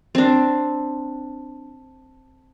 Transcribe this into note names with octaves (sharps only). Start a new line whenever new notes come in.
C4 D4